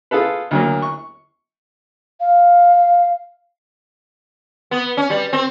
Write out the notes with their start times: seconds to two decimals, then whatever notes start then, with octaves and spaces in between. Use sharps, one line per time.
0.11 F4 G#4 A4 B4
0.51 D2 F#3 A#3
0.82 C#6
2.20 F5
4.71 B3
4.97 C#4
5.10 G3
5.33 C4